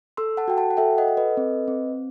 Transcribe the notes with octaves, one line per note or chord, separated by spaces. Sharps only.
A4 C6 E6
F#5 A5
F#4 G5
F#5 A5
F#5
A4 E5 G5
D#5 F#5
A4
B4 D#5
C4
C4